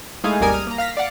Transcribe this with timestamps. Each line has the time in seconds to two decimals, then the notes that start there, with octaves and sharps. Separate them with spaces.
0.24 G#3 A3 D#4 E4 G#4 F5
0.40 G#1 D#2 G3 A#4 G#5 D#6
0.53 D#6 F6
0.67 A#3 A#5
0.78 F5 F6 A#6 B6
0.97 D5 F5 F#5